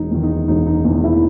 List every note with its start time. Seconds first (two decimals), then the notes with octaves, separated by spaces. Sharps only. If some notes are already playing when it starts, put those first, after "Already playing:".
Already playing: E1 D#4
0.11 E2 D#3
0.23 D#4
0.48 E1 D#4
0.66 D#4
0.85 E2 D#4
0.90 D#3
1.04 E4